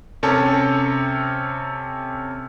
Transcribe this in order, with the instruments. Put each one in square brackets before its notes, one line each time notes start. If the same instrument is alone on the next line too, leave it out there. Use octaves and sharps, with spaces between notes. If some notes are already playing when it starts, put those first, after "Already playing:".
[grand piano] C3 C#4 A4